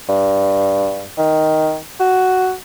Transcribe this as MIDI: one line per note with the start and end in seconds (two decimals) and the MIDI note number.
0.09 1.07 43
1.18 1.77 51
2.00 2.54 66